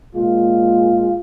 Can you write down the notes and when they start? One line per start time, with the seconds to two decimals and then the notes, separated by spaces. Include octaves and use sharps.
0.13 A#2 G#3 F4